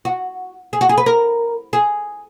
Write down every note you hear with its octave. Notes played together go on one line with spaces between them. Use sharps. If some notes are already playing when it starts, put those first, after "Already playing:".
F#4
G#4
F#4
G#4
B4
A#4
G#4